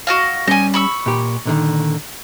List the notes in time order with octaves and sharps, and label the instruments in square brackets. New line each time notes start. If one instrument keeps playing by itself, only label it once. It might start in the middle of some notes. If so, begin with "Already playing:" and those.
[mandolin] F#4 D#5 F5
[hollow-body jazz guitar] G3 C#4 [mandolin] D#5 G#5
[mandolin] B5 C#6 E6
[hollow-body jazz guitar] A#2 G4
A#2 D3 D#3